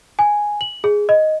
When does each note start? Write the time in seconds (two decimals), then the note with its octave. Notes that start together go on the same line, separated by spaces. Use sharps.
0.19 G#5
0.61 F#7
0.84 G#4
1.09 D#5